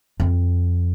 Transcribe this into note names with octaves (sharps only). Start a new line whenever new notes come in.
F2